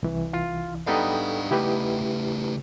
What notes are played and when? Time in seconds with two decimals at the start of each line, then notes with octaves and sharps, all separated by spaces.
0.03 C2 E3
0.33 F4
0.87 G3 B3 D4 D#4 A4 F5 G5
1.51 C#3 A3 E4 G4 B4